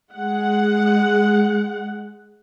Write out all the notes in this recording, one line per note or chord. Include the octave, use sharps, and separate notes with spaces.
G#3 F#5